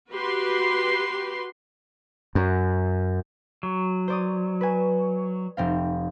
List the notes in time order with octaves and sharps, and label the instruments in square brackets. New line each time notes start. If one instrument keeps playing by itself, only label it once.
[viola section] F#4 G4 B4 C6
[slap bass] F#2
[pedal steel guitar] F#3
[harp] C5 D5 D#6
B4 G#5
F1 C4 F5